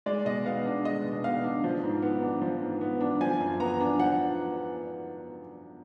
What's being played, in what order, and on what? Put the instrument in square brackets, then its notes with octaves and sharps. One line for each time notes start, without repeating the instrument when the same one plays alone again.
[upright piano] G#3 D5
B2 D#5
B3 F5
D4
G#3 D#5
B2
B3 F5
D4
F3
G#2
B3
D4
F3
G#2
B3
D4
F3 G#5
F#2
B3 A#5
D4
F3 F#5